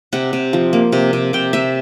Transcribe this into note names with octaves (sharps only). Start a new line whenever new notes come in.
C3 F#5
C3
F3
A#3
C3
C3
C3 G5
C3 E5